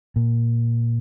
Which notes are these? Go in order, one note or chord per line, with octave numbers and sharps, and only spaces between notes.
A#2